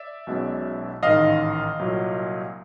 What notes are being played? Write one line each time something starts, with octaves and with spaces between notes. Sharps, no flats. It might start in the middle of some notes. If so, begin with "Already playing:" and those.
Already playing: D5 E5
B1 B2 G#3 C#4
A1 G#2 D#3 D#5 F5
C2 A#2 F#3